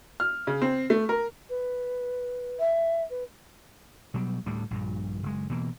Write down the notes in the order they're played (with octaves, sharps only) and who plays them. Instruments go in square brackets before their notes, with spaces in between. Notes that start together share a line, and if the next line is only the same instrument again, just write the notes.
[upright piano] F6
C#3
C4
A3
A#4
[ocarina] B4
[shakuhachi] E5
[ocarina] B4
[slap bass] B2 F#3 G3
D2 A2 G3
A#1 G2 A#2
F#1 G#3
B2 E3 A#3